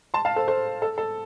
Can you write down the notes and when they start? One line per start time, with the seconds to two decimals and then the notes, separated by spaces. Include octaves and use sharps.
0.14 A5 C6
0.25 F5 A5
0.36 A4 C5
0.48 A4 C5
0.82 A4
0.98 A4